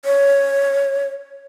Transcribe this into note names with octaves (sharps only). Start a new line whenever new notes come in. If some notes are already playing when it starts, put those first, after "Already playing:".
C#5